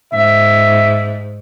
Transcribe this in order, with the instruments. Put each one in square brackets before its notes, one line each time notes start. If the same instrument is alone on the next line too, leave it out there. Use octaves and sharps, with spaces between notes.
[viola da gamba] G#2 [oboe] E5